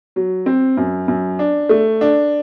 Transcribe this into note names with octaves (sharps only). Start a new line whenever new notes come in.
F#3
C4
F#2
F#2
D4
A3
D4